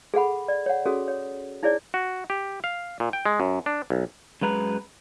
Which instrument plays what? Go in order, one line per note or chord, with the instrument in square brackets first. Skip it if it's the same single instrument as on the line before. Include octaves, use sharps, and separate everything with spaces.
[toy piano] G#4 A4 F#5 B5
D5
C#5 F#5
C#4 F#4 G#4 A4 D#6
C#5
D#4 E4 G#4 C#5 D5
[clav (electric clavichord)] F#4
G4
F5
A#2
G5
G#3
F#2
D4
B1
[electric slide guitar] F#2 G#3 B4 A#5